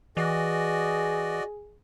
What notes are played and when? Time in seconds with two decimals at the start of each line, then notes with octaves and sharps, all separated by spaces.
0.17 E3 F#4 G#4 D5 D#5